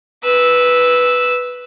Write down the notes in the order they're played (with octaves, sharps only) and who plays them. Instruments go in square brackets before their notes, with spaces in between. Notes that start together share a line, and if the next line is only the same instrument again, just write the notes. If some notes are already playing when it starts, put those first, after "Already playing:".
[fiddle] B4 E6